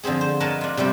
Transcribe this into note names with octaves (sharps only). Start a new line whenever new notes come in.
D3 F3 C4 G#4
C5
A#4 B4 C#5 D#5 A5
D4 F4
C3 F3 G3 C4